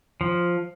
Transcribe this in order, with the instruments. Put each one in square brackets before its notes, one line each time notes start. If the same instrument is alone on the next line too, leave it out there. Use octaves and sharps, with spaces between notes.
[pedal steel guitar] F3